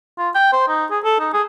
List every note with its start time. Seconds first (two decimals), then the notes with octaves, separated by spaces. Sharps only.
0.18 F4
0.35 G5
0.53 C5
0.68 D#4
0.91 G#4
1.04 A4
1.20 D#4
1.33 G#4